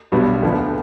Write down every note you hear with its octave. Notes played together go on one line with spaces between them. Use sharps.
B1 B2 G3 B3 D4
D2 D3 F3 B3